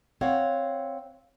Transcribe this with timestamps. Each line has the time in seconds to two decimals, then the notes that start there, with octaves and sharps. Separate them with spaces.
0.21 C4 C#5 F5 F#5